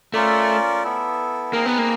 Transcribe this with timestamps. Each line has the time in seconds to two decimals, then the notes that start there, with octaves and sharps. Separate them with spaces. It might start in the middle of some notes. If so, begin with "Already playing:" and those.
0.14 A3 C#4 F4 A#4 D5
0.84 B3 E4 A4
1.53 A#3 C4 D#4 G#4 B4
1.66 B3
1.78 A#3